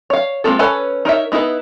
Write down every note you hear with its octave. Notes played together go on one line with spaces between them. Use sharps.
C#5 F5
G#3 A#3 C4 F4 A4
C#4 A4 B4 C#5 G#5
D#4 A#4 C#5 E5
B3 D#4 E4 G#4 B4